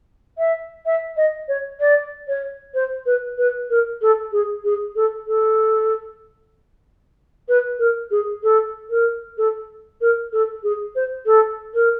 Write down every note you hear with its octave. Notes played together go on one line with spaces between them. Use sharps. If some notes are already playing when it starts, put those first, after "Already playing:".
E5
E5
D#5
C#5
D5
C#5
C5
B4
B4
A#4
A4
G#4
G#4
A4
A4
B4
A#4
G#4
A4
A#4
A4
A#4
A4
G#4
C5
A4
A#4